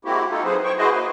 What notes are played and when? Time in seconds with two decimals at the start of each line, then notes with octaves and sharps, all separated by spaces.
0.05 G#3 A#3 C4 E4 F#4 G4
0.30 D#4 F4 A4
0.44 F#3 C4 G#4 B4 C5
0.64 C5 C#5 G5 C#6
0.78 E4 F#4 G#4 B4 C5 D#5
0.92 A#3 B4